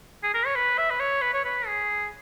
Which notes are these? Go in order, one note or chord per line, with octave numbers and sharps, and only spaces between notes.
G#4
A#4
C#5
B4
E5
B4
C#5
B4
C#5
B4
G#4